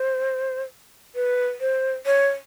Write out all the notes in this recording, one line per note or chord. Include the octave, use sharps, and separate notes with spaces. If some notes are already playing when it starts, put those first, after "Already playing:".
Already playing: C5
B4
C5
C#5